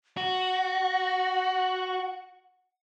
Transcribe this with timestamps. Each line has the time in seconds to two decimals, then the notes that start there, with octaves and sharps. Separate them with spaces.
0.17 F#4 F#5